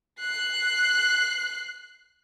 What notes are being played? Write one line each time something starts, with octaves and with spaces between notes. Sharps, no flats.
F#6 C7